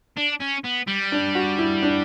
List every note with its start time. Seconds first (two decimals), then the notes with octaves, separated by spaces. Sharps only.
0.17 D4
0.40 C#4
0.64 B3
0.87 G3
1.12 D4
1.35 F#4
1.58 E4
1.83 D4